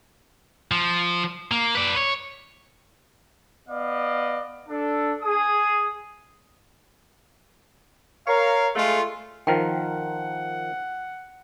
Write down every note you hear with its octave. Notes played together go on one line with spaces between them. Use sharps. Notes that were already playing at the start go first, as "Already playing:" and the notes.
F3
A#3
B4 D5
C#5
B3 D5 D#5 F5
D4 A4
G#4 D#6
A#4 C#5 F5
G#3 A3 F4
D#3 F3 A#4 F#5 G5